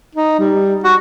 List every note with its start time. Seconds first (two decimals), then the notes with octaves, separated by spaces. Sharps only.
0.15 D#4
0.39 G3
0.84 F#4